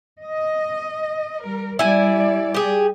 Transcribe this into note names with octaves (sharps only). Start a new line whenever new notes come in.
D#5
G3 A#4
G3 E4 D5 G#5
G4 G#4